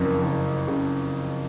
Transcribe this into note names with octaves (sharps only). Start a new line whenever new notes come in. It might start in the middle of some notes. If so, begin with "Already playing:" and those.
Already playing: F#1 F2 C#3
F#1
C#3